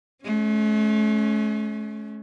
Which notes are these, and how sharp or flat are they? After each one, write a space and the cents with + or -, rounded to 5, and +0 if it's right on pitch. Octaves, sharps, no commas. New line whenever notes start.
A3 -45 C#4 +0